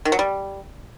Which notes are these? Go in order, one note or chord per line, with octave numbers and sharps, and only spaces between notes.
D#3
F#3
G3